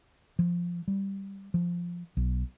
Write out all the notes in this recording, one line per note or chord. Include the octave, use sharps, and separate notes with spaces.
F3
G3
F3
B1